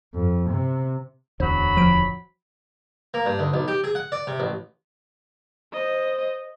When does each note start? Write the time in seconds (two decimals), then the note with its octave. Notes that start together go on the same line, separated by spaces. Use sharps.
0.14 F2
0.50 C3
1.40 D1 E2 D3 F#3 C5 B5
1.77 F3 D7
3.14 A#3
3.26 G2
3.39 D2
3.54 B1
3.68 G4
3.84 G#4
3.95 F#5
4.12 D5
4.27 C3
4.40 A1
5.73 C5 D#5